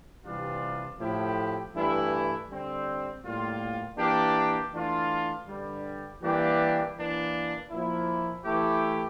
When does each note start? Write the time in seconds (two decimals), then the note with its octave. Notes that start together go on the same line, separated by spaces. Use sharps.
0.25 C3 E3 G3 D4 F4
0.99 A2 F3 A3 E4 G4
1.74 G2 E3 A3 E4
2.49 D3 G3 C4
3.22 A2 G3 A#3 F4
3.98 E3 A#3 D4 G4
4.72 E3 A3 D4 F4
5.47 G2 D3 G3
6.22 E3 G3 A#3 D4 G4
6.96 E3 A#3 D4
7.71 A#2 F3 A#3 E4
8.45 E3 A3 E4 G4